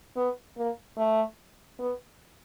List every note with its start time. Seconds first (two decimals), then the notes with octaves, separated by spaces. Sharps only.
0.17 B3
0.57 A#3
0.97 A3
1.79 B3